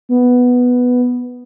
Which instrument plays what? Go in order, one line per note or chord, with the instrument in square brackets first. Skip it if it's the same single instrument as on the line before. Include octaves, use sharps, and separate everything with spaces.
[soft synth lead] B3